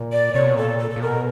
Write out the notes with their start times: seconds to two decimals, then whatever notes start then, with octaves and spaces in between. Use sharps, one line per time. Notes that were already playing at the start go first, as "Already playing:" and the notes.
Already playing: A#2
0.12 D5
0.34 C3 C#5
0.46 B2
0.56 A#2 A4
0.79 A4
0.91 A4
0.96 A#2
1.01 B2 A#4